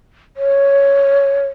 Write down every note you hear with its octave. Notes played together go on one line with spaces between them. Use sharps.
C#5